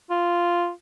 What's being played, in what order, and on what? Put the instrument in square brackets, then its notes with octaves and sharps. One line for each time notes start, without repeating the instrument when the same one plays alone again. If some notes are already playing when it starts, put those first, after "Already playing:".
[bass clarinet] F4